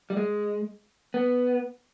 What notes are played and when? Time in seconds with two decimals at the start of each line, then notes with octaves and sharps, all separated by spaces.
0.10 G3
0.17 G#3
1.14 B3